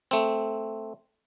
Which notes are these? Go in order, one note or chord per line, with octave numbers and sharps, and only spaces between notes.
A3 C4